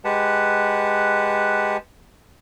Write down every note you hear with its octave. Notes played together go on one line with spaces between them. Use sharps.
G#3 G4 B4 F#5 A5